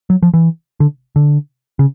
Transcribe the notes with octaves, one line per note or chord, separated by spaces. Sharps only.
F#3
F3
E3
D3
D3
C#3